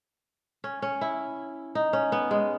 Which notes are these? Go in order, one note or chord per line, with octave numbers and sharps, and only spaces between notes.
C#4
C#4
E4
D#4
C#4
B3
G#3